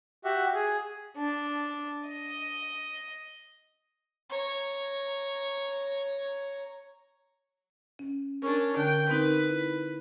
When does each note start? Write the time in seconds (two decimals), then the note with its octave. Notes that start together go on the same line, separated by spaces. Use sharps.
0.24 F#4 G4 E5 F#5
0.54 G#4
1.17 D4
2.08 D#5
4.30 C#5 A#5
7.99 C#4
8.42 C#4 D4 A#4 C#6
8.76 D3 A#4 G5 F#6
9.10 C4 D#4 A#4 B4
9.50 E4